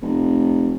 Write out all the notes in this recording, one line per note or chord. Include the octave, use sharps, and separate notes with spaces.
F1